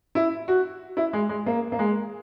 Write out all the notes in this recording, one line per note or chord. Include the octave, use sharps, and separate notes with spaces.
E4
F#4
E4
G#3
G#3
A#3
A#3
G#3